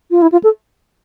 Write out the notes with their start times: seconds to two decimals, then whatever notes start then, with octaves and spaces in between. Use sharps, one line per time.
0.11 F4
0.22 E4
0.32 F4
0.44 A4